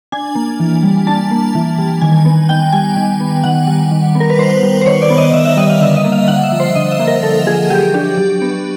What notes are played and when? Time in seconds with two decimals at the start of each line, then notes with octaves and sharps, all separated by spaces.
0.12 D4 G#5
0.35 A#3
0.60 E3
0.83 G3
1.07 D4 A5
1.31 A#3
1.55 E3
1.78 G3
2.01 D#3 G#5
2.25 B3
2.49 D#3 G5
2.73 G3 G#5
2.96 D#3
3.20 B3
3.44 D#3 F#5
3.68 G3
3.91 D#3
4.15 B3
4.20 A#4
4.30 B4
4.39 D#3 C5
4.63 G3
4.81 C5
4.86 D#3 C#5
5.02 D5
5.10 B3
5.18 D#5
5.33 D#3 E5
5.45 E5
5.57 G3 D#5
5.70 F5
5.81 D3 E5
5.96 D#5
6.04 A#3
6.12 F5
6.28 D3 F#5
6.44 E5
6.52 F3
6.60 C5
6.75 D3 D#5
6.92 E5
6.99 A#3
7.07 A#4
7.23 D3 A4
7.47 F3 G#4
7.70 F#3 G4
7.94 D4 G4
8.18 F#3
8.42 B3